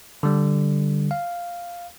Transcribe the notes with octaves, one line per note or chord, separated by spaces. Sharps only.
D3 G3
F5